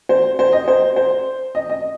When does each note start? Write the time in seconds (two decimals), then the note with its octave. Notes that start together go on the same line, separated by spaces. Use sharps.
0.09 C5
0.39 C5
0.53 D#5
0.68 C5
0.96 C5
1.55 D#5
1.70 D#5